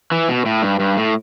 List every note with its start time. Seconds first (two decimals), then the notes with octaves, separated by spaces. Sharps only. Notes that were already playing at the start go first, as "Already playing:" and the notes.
0.12 E3
0.29 B2
0.46 A2
0.62 G2
0.80 G2
0.97 A2